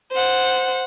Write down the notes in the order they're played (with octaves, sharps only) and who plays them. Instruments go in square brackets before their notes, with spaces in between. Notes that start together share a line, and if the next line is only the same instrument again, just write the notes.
[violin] C5 F#5